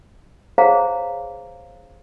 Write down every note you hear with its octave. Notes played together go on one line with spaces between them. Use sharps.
G#4 C5 C#5 F5 A#5